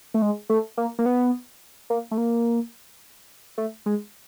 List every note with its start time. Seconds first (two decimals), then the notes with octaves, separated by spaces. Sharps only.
0.14 A3
0.22 G#3
0.50 A3
0.77 A#3
0.99 A#3
1.06 B3
1.90 A#3
2.11 A3
2.18 A#3
3.58 A3
3.86 G#3